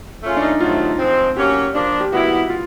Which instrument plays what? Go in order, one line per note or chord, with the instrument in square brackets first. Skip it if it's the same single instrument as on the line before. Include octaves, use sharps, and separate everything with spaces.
[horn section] A3 C#4 F4 G#4
[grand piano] D4
D#4
[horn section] C3 D#3 F#3 A3 [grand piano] F4
[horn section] F3 G#3 C4
[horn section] F#3 A#3 C#4 [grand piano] G4
[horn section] F3 A#3 D4
[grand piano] G4
[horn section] D#3 G3 B3 E4 [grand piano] F#4
[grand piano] F4